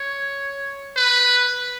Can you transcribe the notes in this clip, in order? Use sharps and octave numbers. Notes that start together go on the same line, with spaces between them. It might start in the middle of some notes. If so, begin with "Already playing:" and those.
Already playing: C#5
B4